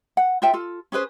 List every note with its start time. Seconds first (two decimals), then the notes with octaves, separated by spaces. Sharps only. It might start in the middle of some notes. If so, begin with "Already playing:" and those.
0.17 F#5
0.42 F4 C5 E5 G5
0.53 F4 A4
0.92 C#4 G#4 B4 C5